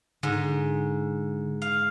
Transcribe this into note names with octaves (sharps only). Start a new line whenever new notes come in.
G#2 D3
F5